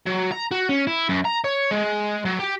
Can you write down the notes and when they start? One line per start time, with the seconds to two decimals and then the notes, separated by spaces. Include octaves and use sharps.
0.06 F#3
0.32 A#5
0.51 F#4
0.69 C#4
0.87 E4
1.09 F#2
1.25 A#5
1.44 C#5
1.71 G#3
2.25 F#3
2.39 G4